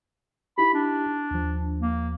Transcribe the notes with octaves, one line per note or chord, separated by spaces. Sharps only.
D#4 E4 G4 B5
D4
D#2 F3
A#3